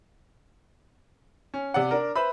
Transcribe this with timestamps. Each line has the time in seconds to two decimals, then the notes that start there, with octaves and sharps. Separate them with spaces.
1.54 C#4
1.74 C3 D5 F#5
1.91 D4 A#4
2.16 B4 C5 E5 B5